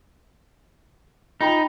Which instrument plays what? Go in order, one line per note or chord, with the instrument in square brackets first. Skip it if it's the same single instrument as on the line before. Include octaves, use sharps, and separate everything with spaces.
[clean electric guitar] D#4 [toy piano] F4 G5 B5